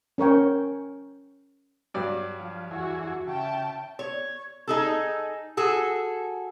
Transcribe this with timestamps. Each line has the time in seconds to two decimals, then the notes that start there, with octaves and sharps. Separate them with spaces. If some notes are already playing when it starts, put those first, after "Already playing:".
0.18 C#4 A#4 C#5 G5
1.94 G2 F#3 D5
2.39 F3
2.71 E2 E3 F#4 G#4
3.27 C#3 E5 G5 A5
3.99 C#5
4.68 D#4 G#4 A4
5.57 F#4 G#4 A4